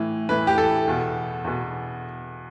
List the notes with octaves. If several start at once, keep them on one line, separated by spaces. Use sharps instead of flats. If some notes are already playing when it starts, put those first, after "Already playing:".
Already playing: A2 E3
A2 E3 B4
G4
A4
E2 B2
E2 B2